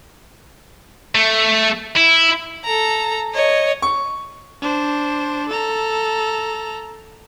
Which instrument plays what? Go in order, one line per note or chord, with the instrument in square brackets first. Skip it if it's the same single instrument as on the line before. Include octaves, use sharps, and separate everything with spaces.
[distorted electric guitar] A3
E4
[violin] A4 A#5
C#5 D#5
[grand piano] C#6
[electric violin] D4 C5
A4 A#5